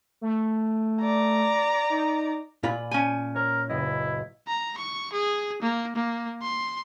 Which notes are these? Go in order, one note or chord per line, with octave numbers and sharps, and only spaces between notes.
A3
D5 A#5
D#4
A#2 F4 D5 G#5 B5
C#4 G#5 G6
A#4 C#5
F#1 B3 E4 D#5
A#5
C#6
G#4
A#3
A#3
C6